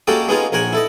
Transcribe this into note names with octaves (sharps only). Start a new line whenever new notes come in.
G#3 A#3 C#4 F#4 G4 A4
G#3 B3 C#4 D#4 F4 G#4
A#1 A#4 C#5 F#5 G#5
E4 A4 D#5